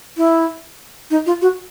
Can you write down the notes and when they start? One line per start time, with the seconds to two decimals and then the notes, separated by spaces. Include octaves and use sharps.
0.17 E4
1.10 D#4
1.26 F4
1.41 F#4